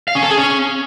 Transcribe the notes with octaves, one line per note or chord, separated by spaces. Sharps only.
F5
C#4
A4
G#4
C#4